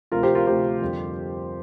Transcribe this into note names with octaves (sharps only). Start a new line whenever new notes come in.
D2 C3 F3 F4 A#4
G4 C5
F4 A#4
D2 C3 F3 G4 C5
F2 D3 G3